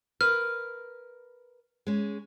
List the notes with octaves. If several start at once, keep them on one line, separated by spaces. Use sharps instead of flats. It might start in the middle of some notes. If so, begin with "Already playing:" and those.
A#4 B4 F6
G#3 C#4